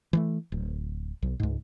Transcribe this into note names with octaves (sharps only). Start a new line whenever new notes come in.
E3 F#3 A3
D1
B1
C#2 G#2